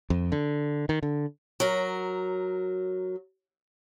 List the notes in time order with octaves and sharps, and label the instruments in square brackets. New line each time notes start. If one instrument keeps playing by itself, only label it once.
[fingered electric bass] F2
D3
D#3
D3
[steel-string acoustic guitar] F#3 A#4